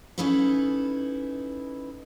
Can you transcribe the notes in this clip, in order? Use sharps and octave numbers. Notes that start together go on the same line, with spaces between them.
C#4 D#4 E4 A4 B4